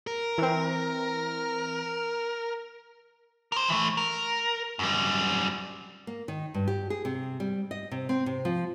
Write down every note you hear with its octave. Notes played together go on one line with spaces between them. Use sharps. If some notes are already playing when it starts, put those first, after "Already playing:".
A#4
E3 C4
A#4 C5
E3 A3
A#4
F#2 G3
A#3
D#3
G2
G4
G#4
C3
G3
D#5
C3
C4
C3
F3